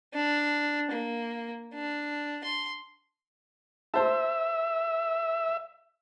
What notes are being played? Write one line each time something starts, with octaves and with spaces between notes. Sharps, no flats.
D4
A#3
D4
C6
C5 E5 A5